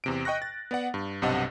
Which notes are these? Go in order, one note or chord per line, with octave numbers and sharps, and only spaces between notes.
E2 C3 D7
D#5 G5 C#6 F#6 A#6
A6
B3 D5 F#5
G2
B1 G2 C3 D#5 F#5 A5